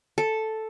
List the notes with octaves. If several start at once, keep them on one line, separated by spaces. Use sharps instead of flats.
A4